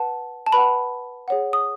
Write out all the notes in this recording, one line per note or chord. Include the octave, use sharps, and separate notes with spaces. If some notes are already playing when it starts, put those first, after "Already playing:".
Already playing: B4 F#5 A5
A5
B4 F#5 B5
G#4 C#5 F#5
D#6